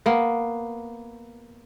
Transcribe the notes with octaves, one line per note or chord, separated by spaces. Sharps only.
A#3 B3